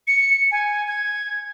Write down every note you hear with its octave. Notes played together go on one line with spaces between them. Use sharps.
C#7
G#5
G#6